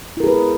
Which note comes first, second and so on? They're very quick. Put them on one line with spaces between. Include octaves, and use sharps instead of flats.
E4 A#4 G#4 B4